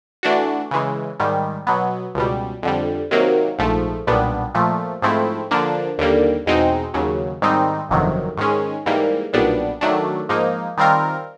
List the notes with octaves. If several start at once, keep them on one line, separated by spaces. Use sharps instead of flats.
E3 A3 D4 F#4
C#3 E3 G#3
G#2 D#3 G3
B2 F#3 B3
C#2 B2 G3
F2 D3 G3
C3 D#3 F#3 A#3
A#1 G#2 F3 A3
B1 A#2 G3 B3 D4
A#2 F3 A3
G#2 F3 A3 C4 E4
D3 F3 A#3 D4
D#2 D3 G3 A#3
E2 B2 G#3 C4 D#4
D#2 C#3 F#3
G#2 D#3 G3 C4 D#4
G1 F2 C3 D#3 F#3
G#2 D#3 G#3 C#4
G#2 E3 G3 A#3
B1 A#2 G3 B3 D4
D#3 F#3 A3 D4
G#2 F3 A#3 D#4
D#3 G3 C4 F4 A#4